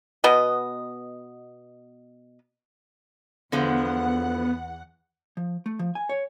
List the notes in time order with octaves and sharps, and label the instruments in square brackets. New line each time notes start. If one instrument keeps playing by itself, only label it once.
[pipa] B2 B3 D#5
[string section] E2 F#5 [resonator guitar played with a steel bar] D3 F3 G#3 [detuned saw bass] B3
[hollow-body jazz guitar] F3
A3
F3
G#5
C#5